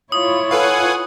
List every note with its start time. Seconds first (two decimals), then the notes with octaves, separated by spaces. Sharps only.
0.12 E4 F4 C#5 D#6
0.51 A4 B4 F5 F#5 G#5